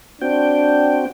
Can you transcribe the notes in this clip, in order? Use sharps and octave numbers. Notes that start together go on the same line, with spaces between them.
C4 D4 F#4 G5